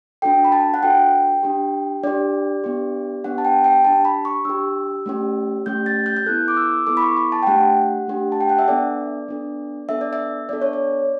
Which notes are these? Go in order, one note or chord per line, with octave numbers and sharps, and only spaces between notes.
D4 F#4 A4 G5
B5
A5
F#5
D4 F#4 A4 G5
D4 G4
D4 G4 D5
B3 D4 G4
B3 D4 G4 F#5
A5
G5
G5
D4 G4 A5
B5
C#6
D4 G4 E6
A3 C#4 G4
A3 C#4 G4 G6
A6
G6
G6
B3 E4 A4 F#6
D6
E6
B3 E4 A4 D6
B5
C#6
B5
A5
G5
A3 D4 G4 F#5
A3 D4 G4
A5
G5
F#5
E5
B3 D4 A4 D5
B3 D4 A4
B3 D4 A4 E5
D5
E5
B3 D4 A4 D5
C#5
D5